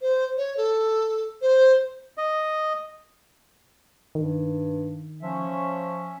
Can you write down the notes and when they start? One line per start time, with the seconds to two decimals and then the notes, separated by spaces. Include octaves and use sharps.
0.01 C5
0.37 C#5
0.57 A4
1.42 C5
2.18 D#5
4.15 G2 D#3
5.23 F3 C#4 E5